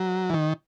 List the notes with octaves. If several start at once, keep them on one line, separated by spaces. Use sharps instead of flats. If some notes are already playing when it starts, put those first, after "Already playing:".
Already playing: F#3
E3
D#3